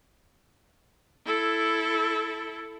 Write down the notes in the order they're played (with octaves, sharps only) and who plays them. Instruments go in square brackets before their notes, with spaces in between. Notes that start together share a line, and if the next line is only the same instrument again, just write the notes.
[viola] E4 A4